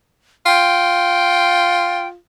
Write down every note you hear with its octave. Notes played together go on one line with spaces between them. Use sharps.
F4 G5